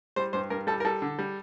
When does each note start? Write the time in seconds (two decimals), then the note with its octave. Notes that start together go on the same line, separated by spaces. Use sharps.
0.16 G3 C5
0.33 G2 C5
0.50 G2 A#4
0.67 G3 A4
0.80 A#4
0.85 G3 A4
1.02 D3
1.19 G3